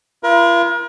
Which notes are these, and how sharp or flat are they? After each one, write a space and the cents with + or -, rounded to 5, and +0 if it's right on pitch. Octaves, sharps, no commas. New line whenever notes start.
F4 -40 A#4 +40